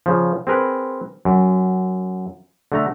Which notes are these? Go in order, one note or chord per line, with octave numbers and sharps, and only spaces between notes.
C#3 F3
C4 G#4 A#4 B4
F#2
D3 A3 A#5